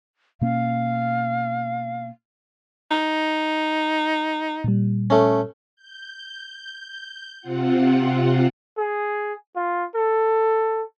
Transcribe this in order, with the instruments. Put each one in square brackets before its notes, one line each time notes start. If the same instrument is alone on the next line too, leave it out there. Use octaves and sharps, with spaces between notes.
[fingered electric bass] B2 A#3 C#4 [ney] F5
[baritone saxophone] D#4
[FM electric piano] A#2 G3
[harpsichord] A3 C#4
[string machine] G6
C3 C4 F4 F#5
[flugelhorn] G#4
F4
A4